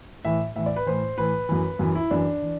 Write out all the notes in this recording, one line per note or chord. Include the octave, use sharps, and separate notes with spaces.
A2 E3 E5
A2 E3 E5
D5
B4
A2 E3 C5
A2 E3 B4
F#2 E3
F#2 E3
E4
F#2 E3 D4
E3